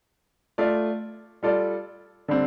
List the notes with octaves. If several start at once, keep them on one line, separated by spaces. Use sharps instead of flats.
A3 F4 D5
G3 F4 A4 D5
D3 G3 C4